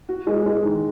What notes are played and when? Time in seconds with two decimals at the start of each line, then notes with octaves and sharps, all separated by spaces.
0.09 F#4
0.27 G#3
0.46 G#3
0.65 D#3